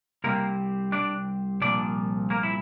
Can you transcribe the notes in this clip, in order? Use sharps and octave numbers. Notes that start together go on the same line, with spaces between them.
C2 C3 G3 A#3 C4 A#4
D4 D5
C2 A#2 F3 D4 D5
A#3 A#4
E4